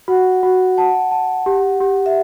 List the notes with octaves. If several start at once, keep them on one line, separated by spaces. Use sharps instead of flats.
F#4 F#5
F#4
F#5 A5
A5
G4
G4
E5